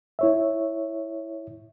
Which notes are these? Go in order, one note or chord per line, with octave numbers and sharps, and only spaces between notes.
E4 C#5 E5